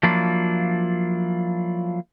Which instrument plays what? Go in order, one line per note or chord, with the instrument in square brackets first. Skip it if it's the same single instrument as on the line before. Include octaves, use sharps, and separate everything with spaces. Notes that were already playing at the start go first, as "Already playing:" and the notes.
[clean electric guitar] F3 F#3 A#3 D4 E4 F4